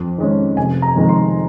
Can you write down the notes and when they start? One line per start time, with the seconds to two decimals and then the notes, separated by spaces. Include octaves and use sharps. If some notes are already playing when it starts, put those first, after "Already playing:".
Already playing: F2
0.18 D#3 G#3 C#4
0.57 F1 G#5
0.82 A#5
0.96 F2 D#3 G#3
1.09 C6